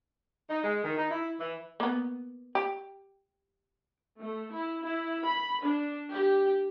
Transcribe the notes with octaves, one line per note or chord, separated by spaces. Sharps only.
D#4
G#3
D#3
D#4
E4
E3
A#3 B3
G4
A3
E4
E4
B5
D4
G4